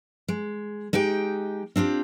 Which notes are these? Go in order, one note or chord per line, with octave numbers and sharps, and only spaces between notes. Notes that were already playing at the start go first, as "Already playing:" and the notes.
G#3
G#3 D#4 G4 G5
C4 D4 F4 G4